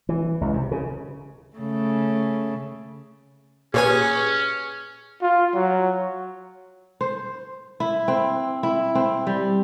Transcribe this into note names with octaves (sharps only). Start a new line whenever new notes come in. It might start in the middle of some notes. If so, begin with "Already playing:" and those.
E3
C#2
C3
C#3
C#3 A3
A#2 C#4 G4 G#4 B4 C#5 G#5
F4
F#3
C5
E4
C4
E4
C4
G3